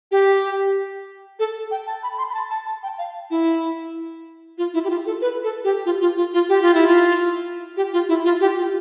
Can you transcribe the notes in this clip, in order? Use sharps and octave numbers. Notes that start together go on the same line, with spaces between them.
G4
A4
G5
A5
B5
C6
B5
A5
A5
A5
G5
F5
E4
F4
E4
G4
F4
A4
B4
A4
G4
F4
F4
F4
F4
G4
F4
E4
F4
G4
F4
E4
F4
G4
F4